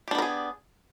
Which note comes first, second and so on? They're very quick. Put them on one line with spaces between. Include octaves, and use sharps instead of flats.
G4 D4 B3 A#4 G#4